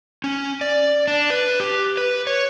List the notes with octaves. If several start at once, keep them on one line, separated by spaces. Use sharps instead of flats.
C#4
D5
D4
B4
G4
B4
C#5